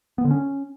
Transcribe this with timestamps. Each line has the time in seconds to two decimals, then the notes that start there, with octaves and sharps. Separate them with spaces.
0.18 B3
0.24 D3
0.31 C#4